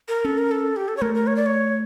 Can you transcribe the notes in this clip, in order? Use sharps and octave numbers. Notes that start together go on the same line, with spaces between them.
A#4
C#4 A4
A#4
A4
G4
A4
C#5
A3 A#4
A#4
C#5
D5
C#5